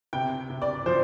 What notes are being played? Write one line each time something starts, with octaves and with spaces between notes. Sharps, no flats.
C3 G5
C3
D5
F3 C5